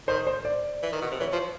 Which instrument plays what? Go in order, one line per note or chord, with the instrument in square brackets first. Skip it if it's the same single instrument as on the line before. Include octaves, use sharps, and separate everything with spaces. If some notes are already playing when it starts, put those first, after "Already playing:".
[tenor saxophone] D#3 [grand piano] C5
[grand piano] C5
D5
[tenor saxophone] E3
D#3
B2
C3
[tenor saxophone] E3 [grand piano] C#5
[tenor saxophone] F3